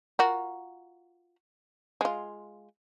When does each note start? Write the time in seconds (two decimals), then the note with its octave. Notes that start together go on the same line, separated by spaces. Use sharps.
0.19 F4 F#4 A#4
2.01 G#3 F4